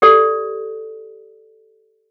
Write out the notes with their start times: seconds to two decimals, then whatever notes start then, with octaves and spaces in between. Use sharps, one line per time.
0.02 G4 A4 D5